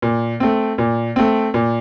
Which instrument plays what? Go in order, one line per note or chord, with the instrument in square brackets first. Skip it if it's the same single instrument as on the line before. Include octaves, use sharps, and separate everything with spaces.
[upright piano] A#2
A3 C4
A#2
A3 C4
A#2